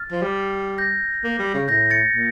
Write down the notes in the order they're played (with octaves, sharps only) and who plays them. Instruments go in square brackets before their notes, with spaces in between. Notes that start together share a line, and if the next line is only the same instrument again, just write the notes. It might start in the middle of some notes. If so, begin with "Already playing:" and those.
Already playing: [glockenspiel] F6 A6
[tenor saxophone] F3
G3
[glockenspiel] G6 A#6
[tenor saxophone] A#3
G3
C#3
[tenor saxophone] A2 [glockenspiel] G6 A#6
[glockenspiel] A6 C#7
[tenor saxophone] A#2